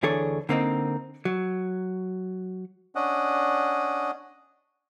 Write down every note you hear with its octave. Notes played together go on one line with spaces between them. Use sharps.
D2 E3 D4 G#4 A4 C#5
D3 A#3 C4 D#4
F#3
C#4 D4 D#5 F#5